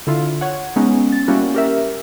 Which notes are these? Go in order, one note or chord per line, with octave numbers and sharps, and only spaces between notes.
D3 E4 F4
C#5 F#5
G#3 B3 C#4 D#4
A6
G3 A#3 C#4 E4 F#4
G4 A#4 E5